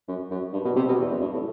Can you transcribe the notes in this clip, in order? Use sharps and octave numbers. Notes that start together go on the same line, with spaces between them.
F#2
F#2
G2
B2
C3
B2
E2
F#2
G2
A2